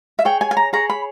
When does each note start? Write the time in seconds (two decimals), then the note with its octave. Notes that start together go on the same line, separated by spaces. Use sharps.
0.19 E5
0.25 G#4 C#5 G5
0.41 G#5
0.51 G#5
0.57 A#5
0.73 G#4 C#5 A#5
0.90 B5